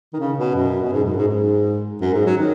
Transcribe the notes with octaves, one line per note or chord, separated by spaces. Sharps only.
D#3
C#3
B2
F#2
B2
G#2
F#2
G#2
G#2
F#2
G#2
F#3
D#3